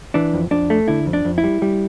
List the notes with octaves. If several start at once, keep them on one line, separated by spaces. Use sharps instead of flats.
E3 D4
F2
F2 D4
A3
D3 E4
F2
D4
F2
E4
G3
G3